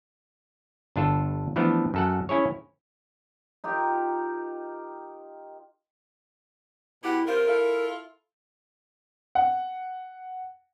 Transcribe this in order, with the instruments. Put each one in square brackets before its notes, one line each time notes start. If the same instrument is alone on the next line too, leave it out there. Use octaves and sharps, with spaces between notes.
[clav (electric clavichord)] G1 D4 F4 A4
E3 F3 A3 B3 D4
F#2 A4 F#5
C#4 E4 G#4 C#5
[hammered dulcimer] D#4 F4 G4 A#4
[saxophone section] B2 G4 F#5 [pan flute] E4
[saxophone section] C3 F4 C5 [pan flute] A#4
[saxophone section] E4 F4 A4
[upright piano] F#5